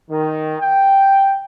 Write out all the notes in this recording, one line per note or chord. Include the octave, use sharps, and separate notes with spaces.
D#3
G5